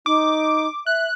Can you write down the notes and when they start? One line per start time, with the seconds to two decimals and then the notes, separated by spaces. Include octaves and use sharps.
0.06 D#4 D6
0.86 E5 F#6